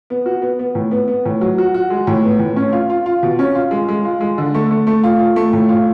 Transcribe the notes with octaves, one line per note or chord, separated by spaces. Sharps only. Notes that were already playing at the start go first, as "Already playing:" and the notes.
B3
F#4
B3
B3
A2
B3
B3
A2
F#3
F#4
F#4
G#3
A2
B3
A2
C#4
F4
F4
F4
B2
C#4
F4
G#3
G#3
F4
G#3
D3
A3
A3
A3
F4
F4
A3
A2
F4